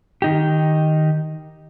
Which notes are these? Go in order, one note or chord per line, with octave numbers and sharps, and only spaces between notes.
D#3 D#4 G4